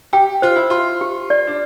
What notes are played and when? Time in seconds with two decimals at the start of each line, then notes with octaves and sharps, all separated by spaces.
0.13 G4 G5
0.42 F4 C5
0.56 E4
0.70 F4 C6
1.01 G4
1.30 D5
1.47 D4